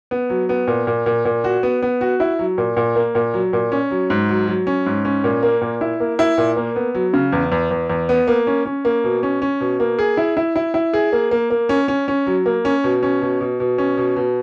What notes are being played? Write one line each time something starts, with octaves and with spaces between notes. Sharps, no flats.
B3
F#3
B3
A#2
A#2
A#2
A#2
F#4
B3
B3
F#4
E4
F#3
A#2
A#2
A#3
A#2
F#3
A#2
C#4
F#3
G#2
F#3
F#3
C#4
G#2
C#4
A#2
A#3
A#2
E4
A#3
E4
A#2
A#3
B3
F#3
C#3
E2
E2
E2
E2
B3
A#3
C#4
C#4
A#3
B2
C#4
C#4
B2
A#3
G#4
E4
E4
E4
E4
G#4
A#3
A#3
A#3
C#4
C#4
C#4
F#3
A#3
C#4
B2
C#4
B2
B2
B2
C#4
B2
B2